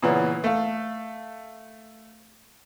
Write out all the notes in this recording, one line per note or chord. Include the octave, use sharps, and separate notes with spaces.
A#2 C#3 E3 B3 C#4
A3 F5